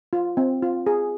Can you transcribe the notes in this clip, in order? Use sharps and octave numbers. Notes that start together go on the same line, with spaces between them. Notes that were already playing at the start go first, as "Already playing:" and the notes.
F4
C4
F4
G#4